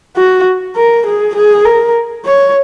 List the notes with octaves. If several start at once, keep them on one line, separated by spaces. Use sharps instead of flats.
F#4
A#4
G#4
G#4
A#4
C#5